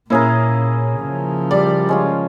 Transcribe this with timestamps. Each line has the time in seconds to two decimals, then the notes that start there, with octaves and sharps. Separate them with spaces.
0.10 A#2 A#3 C#4 E4 G#4 A#4
1.00 C#3 F3
1.51 G3 D5
1.89 G#3 C#4 F4